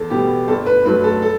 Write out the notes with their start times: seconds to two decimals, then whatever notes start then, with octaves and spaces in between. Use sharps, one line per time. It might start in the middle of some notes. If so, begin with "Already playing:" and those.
Already playing: E2 A4
0.10 B2 G3 B3 G4
0.48 G1 A4
0.66 B4
0.85 G2 F#3 A3 B4
1.04 A4
1.22 A4